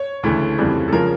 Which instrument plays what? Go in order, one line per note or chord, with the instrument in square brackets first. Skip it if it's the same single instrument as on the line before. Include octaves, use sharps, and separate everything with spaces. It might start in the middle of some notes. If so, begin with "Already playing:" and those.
Already playing: [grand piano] C#5
D2 C#3 E3 A3
F2 C#3 E3 G3
A4
C#3 F3 A#4